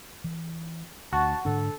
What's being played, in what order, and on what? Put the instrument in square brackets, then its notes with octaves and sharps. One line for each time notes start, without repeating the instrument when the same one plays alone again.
[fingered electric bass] E3
[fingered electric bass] D2 [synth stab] F#4 [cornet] A5
[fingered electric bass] G#2 D3 D4 [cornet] A4